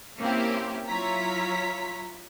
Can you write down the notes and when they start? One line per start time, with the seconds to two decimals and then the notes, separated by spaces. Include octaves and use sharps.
0.20 A#3 C4 C#4 E4 G4
0.87 F#3 E4 F4 C#5 A#5 B6